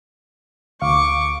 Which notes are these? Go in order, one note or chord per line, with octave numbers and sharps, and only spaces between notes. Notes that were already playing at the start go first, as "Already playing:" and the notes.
D2 F5 C#6 D6